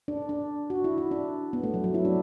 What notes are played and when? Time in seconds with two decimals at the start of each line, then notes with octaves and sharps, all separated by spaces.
0.08 D4
0.29 D4
0.70 F#4
0.84 E4
0.98 E4
1.11 D4
1.53 B3
1.63 A3
1.74 F#3
1.84 F#3
1.94 E4
2.05 D4